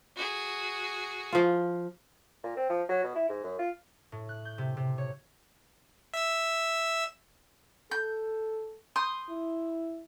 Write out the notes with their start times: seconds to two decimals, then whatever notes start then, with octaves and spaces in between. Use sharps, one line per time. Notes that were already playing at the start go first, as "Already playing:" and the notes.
0.16 F#4 G#4
1.33 F3 F4
2.44 A#2
2.57 C4
2.70 F3
2.89 F#3
3.04 B2
3.16 E4
3.29 G#2
3.44 F#2
3.59 F4
4.12 A2
4.29 F#6
4.45 G6
4.58 C3
4.77 C3
4.98 C#5
6.14 E5 E6
7.91 A4 G6
8.96 C6 D#6 G6
9.29 E4